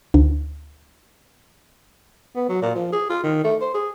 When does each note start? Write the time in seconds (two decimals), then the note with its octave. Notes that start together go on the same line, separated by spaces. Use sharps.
0.14 D2
2.36 B3
2.49 F#3
2.62 A#2
2.75 F3
2.92 G#4
3.09 F4
3.23 D#3
3.44 A3
3.61 C5
3.74 G#4